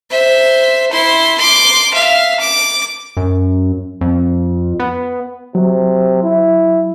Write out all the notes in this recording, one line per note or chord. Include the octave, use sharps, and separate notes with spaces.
C5 E5
E4 C6
C6 D6
E5 F5
D6
F#2
F2
B3
C3 F#3
E4